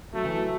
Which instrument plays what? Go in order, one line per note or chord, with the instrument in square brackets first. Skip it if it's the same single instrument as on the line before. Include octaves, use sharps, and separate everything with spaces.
[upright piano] F#3 [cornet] A3
[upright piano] E3
F#3